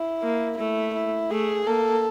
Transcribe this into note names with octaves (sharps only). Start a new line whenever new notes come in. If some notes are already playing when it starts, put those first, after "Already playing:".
Already playing: E4
A#3
A3 E4
E4
A3 G#4
A#3 A4